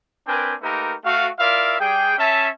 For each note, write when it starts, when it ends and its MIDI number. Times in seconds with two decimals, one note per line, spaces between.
0.27 0.54 60
0.27 0.54 62
0.27 0.54 70
0.27 0.54 71
0.27 0.54 79
0.27 0.54 80
0.62 0.94 57
0.62 0.94 58
0.62 0.94 63
0.62 0.94 67
0.62 0.94 70
0.62 0.94 71
1.05 1.28 57
1.05 1.28 66
1.05 1.28 77
1.39 1.76 64
1.39 1.76 65
1.39 1.76 70
1.39 1.76 74
1.39 1.76 76
1.39 1.76 77
1.79 2.15 55
1.79 2.15 68
1.79 2.15 79
2.17 2.48 61
2.17 2.48 76
2.17 2.48 81